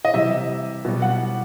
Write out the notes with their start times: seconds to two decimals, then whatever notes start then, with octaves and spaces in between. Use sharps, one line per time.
0.05 D#5
0.14 C3 E3 G3 E5
0.85 B2 G3
1.02 F#5